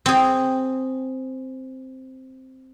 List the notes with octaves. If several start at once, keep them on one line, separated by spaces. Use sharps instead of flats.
C4 G#4